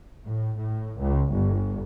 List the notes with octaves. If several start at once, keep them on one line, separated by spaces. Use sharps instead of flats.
A2
A2
C#2
G1